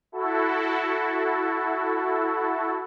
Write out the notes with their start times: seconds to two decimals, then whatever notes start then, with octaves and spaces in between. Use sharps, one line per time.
0.12 E4 F#4 A4